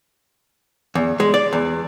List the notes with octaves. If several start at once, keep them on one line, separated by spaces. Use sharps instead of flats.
E2
G#3
D5
E2